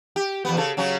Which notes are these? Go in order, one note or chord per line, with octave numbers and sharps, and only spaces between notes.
G4
E2 B3
C#3 A4
C#3 F#3 C#4